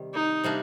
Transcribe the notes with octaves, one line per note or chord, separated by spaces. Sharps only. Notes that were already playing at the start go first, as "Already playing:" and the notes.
Already playing: C3 D#3 G3
D#4
C3 G3 A#3 D4